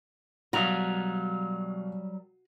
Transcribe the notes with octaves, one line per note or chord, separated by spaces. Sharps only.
B2 F#3 G3 F#4 A#4 F5 D#6